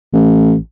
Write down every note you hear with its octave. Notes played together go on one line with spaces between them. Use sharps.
A1